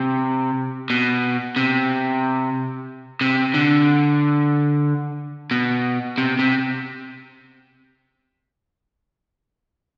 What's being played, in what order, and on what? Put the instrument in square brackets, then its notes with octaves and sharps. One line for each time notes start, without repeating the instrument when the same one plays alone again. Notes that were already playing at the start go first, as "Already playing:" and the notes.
Already playing: [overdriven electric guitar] C3
B2
C3
C3
D3
B2
C3
C3